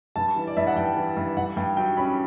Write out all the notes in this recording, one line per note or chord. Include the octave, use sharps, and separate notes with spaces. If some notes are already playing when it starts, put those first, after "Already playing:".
G2 A5
E3
D5
G2 E5
F#5
G2 G5
E3
G2
G2 F#5
G2 G5
F#3 G5
C#4 B5